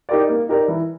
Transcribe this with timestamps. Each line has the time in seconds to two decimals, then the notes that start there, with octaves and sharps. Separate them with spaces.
0.09 D#4 G4 A#4 D5
0.29 A#3
0.49 D#4 G4 A#4 D5
0.68 E3